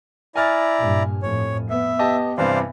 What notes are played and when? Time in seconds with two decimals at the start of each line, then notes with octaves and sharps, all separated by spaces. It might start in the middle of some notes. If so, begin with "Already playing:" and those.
0.36 E4 D5 G#5 A#5 F6 A6
0.80 G2 A#2
1.22 F2 A2 C#5
1.70 B3 E5
1.99 G4 D#5 A5
2.38 G2 C3 E3 C5 D5 F5